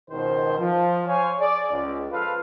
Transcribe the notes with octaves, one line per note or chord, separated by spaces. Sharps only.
C#2 B2 D#3 C5
F3
C5 C#5 F5 G#5
G#4 D5
C#2
F3 F4 A4 B4 F5